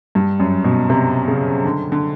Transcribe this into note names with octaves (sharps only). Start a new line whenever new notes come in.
G2
F#2
B2
C3
C#3
D3
D3